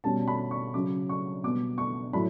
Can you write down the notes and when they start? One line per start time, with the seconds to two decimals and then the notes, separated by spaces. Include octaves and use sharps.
0.04 B2 G3 C#4 A5
0.28 B5
0.51 C#6
0.74 C#3 F#3 C#4 D6
1.09 C#6
1.44 B2 G3 B3 D6
1.78 C#6
2.13 A2 F#3 B5